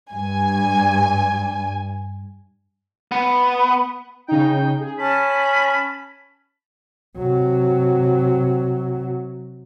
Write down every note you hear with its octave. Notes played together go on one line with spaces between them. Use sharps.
G2 G#5
B3
C#3 D#4 G5
G#4
C#4 A5 B5
C3 F#3